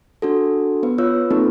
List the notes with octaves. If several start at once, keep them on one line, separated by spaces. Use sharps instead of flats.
D4 F#4 A4
B3 B4
F4 B4 C#5 E6
A#3 C4 D#4 F4 A4 B4